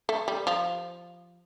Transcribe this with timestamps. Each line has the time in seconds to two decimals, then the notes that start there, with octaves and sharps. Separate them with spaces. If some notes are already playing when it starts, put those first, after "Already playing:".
0.09 A3
0.28 G3
0.47 F3